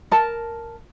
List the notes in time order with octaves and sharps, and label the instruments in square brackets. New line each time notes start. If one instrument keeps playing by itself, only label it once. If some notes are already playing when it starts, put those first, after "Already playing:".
[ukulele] A#4 A5